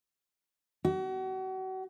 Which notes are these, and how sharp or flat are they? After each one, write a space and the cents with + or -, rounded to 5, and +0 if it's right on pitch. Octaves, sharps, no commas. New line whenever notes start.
F#4 +35